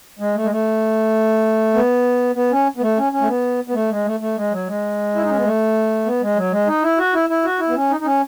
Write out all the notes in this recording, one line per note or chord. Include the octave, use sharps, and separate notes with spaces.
G#3
A3
G#3
A3
B3
B3
C#4
B3
A3
C#4
C#4
A3
B3
B3
A3
G#3
A3
A3
G#3
F#3
G#3
E4
D#4
C#4
B3
A3
B3
G#3
F#3
G#3
D#4
E4
F#4
E4
E4
F#4
E4
B3
C#4
D#4
D#4
C#4